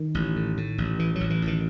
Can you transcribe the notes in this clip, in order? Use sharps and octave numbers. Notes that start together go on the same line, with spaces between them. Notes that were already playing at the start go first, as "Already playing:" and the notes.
Already playing: D#3
A1
A2
A2
A1
A2 E3
A1 F#3
E3
A1
D#3